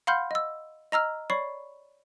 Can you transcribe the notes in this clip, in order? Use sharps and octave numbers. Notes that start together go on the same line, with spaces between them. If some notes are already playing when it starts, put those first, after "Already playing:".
F5 F#5 B5 C6 F6 G6
D#5 E6
D#5 A#5 E6 F6
C#5 D5 B5 C#6 C7